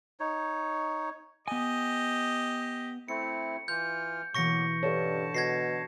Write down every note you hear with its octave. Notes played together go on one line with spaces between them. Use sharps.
D#4 C#5
B3 G4 D#5 G#5
A3 C4 E4 C#7
E3 F4 F6 G6
B2 E3 F#3 A#3 C#6 A#6 C#7
G2 D3 A4 C#5 A5
B2 G#6 A#6 C7